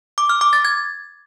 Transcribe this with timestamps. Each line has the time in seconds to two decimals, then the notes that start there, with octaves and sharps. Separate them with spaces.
0.18 D6
0.29 F6
0.41 D6
0.53 A6
0.65 G#6